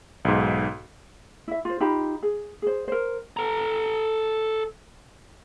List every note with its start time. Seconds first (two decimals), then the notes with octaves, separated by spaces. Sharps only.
0.25 B1 G#2
1.48 E4 E5
1.65 F4 C5
1.80 D#4 F4 G4 B5
2.23 G#4
2.62 G#4 C5
2.88 A#4 C5
3.37 A4 A#5